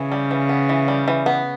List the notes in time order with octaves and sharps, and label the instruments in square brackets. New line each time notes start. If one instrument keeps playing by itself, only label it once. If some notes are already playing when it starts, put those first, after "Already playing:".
Already playing: [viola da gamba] C#3 [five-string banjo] E3
[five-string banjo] G3
E3
B3
E3
G3
E3
B3